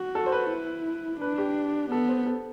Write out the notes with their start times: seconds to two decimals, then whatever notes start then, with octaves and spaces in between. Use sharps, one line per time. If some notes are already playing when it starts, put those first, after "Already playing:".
Already playing: F#4
0.15 A4
0.26 C5
0.32 B4
0.50 E4
1.21 D4 B4
1.38 G4
1.91 B3 A4
2.09 C5
2.26 A4